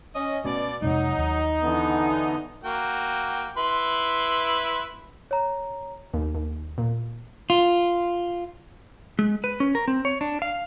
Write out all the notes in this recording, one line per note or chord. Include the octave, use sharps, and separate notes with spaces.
C#4 D#5
B2 A3 C#4 D5
F2 C3 F#3 G#3 D#4
D#2
D3 E3 B3
A#3 F#4 G5
E4 B4 C6
C#5 A#5
D#2
D#2
A#2
F4
G#3
B4
C#4
A#4
C4
C#5
D4
F5